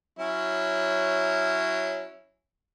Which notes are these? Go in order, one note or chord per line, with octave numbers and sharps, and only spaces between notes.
F#3 C#4 E4